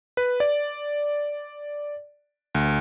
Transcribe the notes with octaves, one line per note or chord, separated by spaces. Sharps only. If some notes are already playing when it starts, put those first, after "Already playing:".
B4
D5
D2